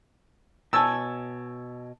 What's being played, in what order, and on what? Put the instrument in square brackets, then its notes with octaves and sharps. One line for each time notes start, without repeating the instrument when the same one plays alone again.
[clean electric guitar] B2 C#5 G#5 [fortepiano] A5 E6